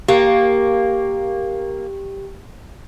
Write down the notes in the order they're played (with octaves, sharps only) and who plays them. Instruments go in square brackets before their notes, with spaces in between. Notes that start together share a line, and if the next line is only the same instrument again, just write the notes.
[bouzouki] A#3 [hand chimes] G4